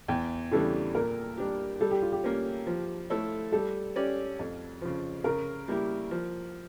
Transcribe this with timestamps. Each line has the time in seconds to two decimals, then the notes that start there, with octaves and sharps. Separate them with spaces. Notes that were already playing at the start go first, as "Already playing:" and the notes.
0.08 E2 G5
0.51 C#3 E3 G3 D4 A4
0.95 A#2 A#4
1.38 G3 D4 G4
1.81 G3 A4
1.91 G4
2.02 F4
2.12 G4
2.24 A#3 C#4
2.67 F3
3.10 A3 E4 A4 C#5
3.52 G3 A4
3.96 C#4 G4 D5
4.39 F2
4.81 C#3 F3
5.24 C#3 A#4
5.68 G3 A#3 E4 G4
6.11 F3